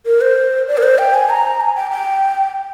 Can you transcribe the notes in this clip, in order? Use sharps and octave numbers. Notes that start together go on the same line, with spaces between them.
A#4
C5
D5
A#4
C5
G5
G#5
A#5
G#5
G5
G5